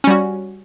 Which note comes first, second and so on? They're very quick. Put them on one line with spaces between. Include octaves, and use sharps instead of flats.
C#4 G3 F#4